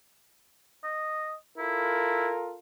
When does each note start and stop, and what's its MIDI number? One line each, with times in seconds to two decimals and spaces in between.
0.84 1.33 75
1.58 2.28 64
1.58 2.57 65
1.58 2.57 69
1.58 2.57 70